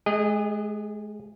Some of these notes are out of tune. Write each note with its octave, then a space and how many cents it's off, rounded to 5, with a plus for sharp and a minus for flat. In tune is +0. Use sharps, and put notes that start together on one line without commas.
G#3 +30 G#4 -35 D#5 -15